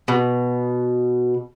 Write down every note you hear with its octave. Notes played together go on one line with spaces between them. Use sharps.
B2